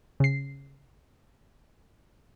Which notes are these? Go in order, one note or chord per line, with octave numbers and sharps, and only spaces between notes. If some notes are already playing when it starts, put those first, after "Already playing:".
C#3 C7